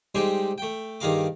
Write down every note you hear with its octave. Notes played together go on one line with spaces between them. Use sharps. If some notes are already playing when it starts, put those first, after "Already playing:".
G3 G#3 C4 D#4 G4 G#4
A3 G5
G2 D#3 G#4 F5 A#5 D6